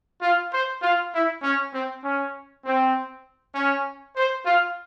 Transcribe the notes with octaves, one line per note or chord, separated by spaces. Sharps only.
F4
C5
F4
E4
C#4
C4
C#4
C4
C#4
C5
F4